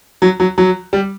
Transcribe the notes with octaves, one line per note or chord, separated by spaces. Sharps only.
F#3
F#3
F#3
G3